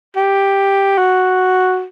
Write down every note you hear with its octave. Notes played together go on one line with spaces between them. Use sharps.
G4
F#4